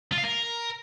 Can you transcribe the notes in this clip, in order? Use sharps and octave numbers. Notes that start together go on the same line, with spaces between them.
F4
F5
A#4